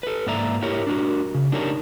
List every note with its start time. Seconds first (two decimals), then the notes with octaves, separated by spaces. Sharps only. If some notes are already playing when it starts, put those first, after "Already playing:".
0.03 A4 B4
0.27 G#2 A#3 B4 D5 E5 A#5
0.62 E4 G4 A#4 C#5
0.87 D4 F#4 A#4
1.35 C#3
1.52 D4 D#4 G4 A#4 C#5